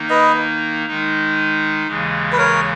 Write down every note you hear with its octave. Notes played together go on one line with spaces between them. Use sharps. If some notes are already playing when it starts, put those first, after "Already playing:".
Already playing: D#3 A#3 D#4
B4 D#5
D#3 G#3 D#4
D#2 C#3 E3 G#3
B4
A#4 C#5